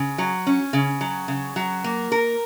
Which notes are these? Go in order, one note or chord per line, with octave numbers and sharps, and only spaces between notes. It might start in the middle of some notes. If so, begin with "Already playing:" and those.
Already playing: C#3
F#3
C#4
C#3
F#3
C#3
F#3
A#3
A#4